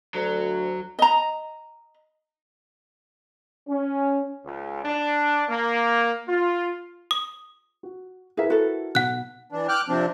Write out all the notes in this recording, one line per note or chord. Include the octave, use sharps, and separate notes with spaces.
D2 F#3
D#5 A#5
C#4
C#2
D4
A#3
F4
D#6
F#4
E4 G#4 A#4 B4 E5
F#4 A4
B1 F#5 F#6
E3 D4
G5 D6 F6 F#6
C3 F3 C4 D4